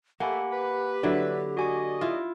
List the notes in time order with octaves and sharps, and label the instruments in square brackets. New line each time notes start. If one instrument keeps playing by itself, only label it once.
[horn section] A3 [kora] A#3 [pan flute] G4 [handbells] F#5 G#5 B5
[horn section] B4
[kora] D3 F#3 E4 [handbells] D5
[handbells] F#4 G#5 C#6 [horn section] D5 D#5
[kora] E4 F4